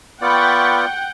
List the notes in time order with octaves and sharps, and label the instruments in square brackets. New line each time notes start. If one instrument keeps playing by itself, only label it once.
[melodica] B3 F4 D5 [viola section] F#5 G5 [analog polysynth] B5 C#6 A6